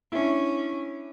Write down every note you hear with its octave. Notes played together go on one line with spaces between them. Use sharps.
C#4 D4 E4